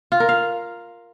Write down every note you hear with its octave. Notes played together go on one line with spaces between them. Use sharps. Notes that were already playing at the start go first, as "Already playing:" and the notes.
F4
A#4
F5